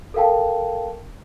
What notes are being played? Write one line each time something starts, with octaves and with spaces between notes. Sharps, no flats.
A4 A#4 F5 G5 A5